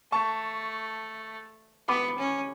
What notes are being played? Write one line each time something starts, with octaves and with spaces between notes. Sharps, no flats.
A3 A5 C#6
B3 B5 D6
C#4